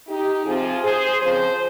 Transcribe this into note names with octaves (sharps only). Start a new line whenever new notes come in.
D#4 G4
C3 F3 C4 F4 G#4
G#4 C5
C#3 F3 C4 G#4 C5